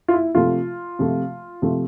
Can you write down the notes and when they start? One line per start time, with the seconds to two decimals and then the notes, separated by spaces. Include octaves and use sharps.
0.08 F4
0.14 E4
0.35 C3 F3 A3 F4
0.99 C3 F3 A3
1.62 C3 F3 A3